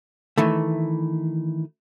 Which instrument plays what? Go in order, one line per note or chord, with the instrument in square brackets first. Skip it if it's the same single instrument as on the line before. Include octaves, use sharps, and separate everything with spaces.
[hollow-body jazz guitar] D#3 E3 A3